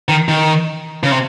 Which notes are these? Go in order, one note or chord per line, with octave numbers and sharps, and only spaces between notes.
D#3
D#3
C#3
C3